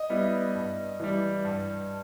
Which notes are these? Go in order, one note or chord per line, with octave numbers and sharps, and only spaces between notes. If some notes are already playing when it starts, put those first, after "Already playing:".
Already playing: D#5
G3 B3 E4
G2
E3 G3
G2